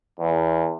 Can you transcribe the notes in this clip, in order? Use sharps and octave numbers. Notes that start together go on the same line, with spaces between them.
E2